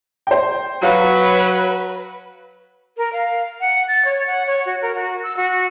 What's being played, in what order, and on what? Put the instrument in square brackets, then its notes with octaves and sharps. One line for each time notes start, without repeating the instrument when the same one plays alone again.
[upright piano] C5 G5
[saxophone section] F#3 [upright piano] F#4 F5 [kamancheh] B4
[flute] A#4
F5
F#5
A6
C#5
F#5
C#5
F#4
A#4
F#4
E6
F#4